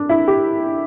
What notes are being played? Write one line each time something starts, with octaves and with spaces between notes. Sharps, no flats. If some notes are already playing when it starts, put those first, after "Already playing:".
Already playing: D4
E4
G4